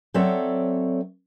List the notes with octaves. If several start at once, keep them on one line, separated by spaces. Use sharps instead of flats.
F#3 C4 A4 C#5 D5 E5